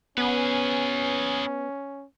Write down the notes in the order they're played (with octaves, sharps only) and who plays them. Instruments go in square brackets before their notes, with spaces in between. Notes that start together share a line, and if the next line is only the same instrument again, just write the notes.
[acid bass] B3 [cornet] C#4 [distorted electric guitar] G#4 B4